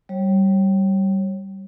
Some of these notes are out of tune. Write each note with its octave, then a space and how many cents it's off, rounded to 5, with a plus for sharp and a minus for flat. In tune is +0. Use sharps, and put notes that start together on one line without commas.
G3 -20 C#5 -30